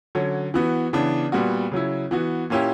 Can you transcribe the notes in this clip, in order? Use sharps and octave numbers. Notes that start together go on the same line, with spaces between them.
D3 F#3 C#4
E3 B3 F#4
C#3 E3 B3 D4
A#2 G3 B3 F#4
C#3 F#3 C#4 E4
E3 B3 F#4
A#2 A#3 C#4 E4 G4